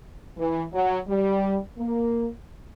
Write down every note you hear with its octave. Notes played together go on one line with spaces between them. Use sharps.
E3
F#3
G3
A#3